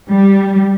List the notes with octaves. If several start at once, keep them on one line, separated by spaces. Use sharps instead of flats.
G3